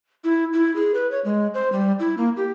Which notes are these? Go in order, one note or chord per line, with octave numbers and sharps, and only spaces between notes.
E4
E4
G#4
B4
C#5
G#3
C5
G3
E4
A#3
G4